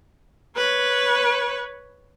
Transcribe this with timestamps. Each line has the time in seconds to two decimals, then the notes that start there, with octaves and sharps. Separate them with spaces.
0.57 B4 C#5